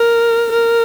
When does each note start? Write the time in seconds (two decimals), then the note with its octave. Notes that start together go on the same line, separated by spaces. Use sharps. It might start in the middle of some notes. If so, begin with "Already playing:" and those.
Already playing: A#4
0.52 A#4